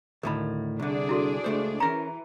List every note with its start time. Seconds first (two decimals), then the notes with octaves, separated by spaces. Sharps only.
0.23 D2 A2 D#3 A#4 B5
0.80 C2 D3 D4 G#4 D5
1.09 E4 F#4 A4
1.44 C#2 A3 C5
1.80 E3 C#4 A#4 A#5